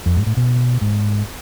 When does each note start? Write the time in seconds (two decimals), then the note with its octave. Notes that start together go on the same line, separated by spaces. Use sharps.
0.06 F2
0.17 G#2
0.26 A2
0.37 B2
0.81 G#2